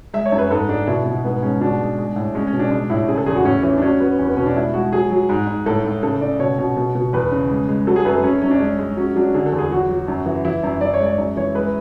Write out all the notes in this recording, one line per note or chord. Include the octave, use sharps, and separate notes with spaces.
G#3 E5
C#5
F#2
B4
G#2 A4
G#3 D4
B2 E4
B2
G#2 B3
G#3 C#4
B2 D4
G#3
G#3
A2
G#3 C#4
C#4
B2
D4
G#3 D4
A2 E4
C#3 G#4
A4
E2 G#4
F#4
A2 C#4
E3 C#4
D4
F#3 C#4
F#3 B3
E2 C#4
B3
B2 C#4
D4
G#3 E4
G#3 F#4
F#3 G#4
F#3
G#2
G#2
A2 A4
A2
C#3 A4
C#3 D5
B2 C#5
B2
B2
B2
E2 B4
C#3
G#3
G#3
F#3 A4
G#4
F#2 B4
A4
F#2 C#4
F#2 C#4
D4
G#3 C#4
G#3
F#3 C#4
F#3 D4
D3 G#4
A4
E2
G#4
F#3 F#4
F#3
F#2
E3
E3 E4
F#2
F#2 D5
C#5
G#3
D5
F#2
E3 C#5
G#3 B4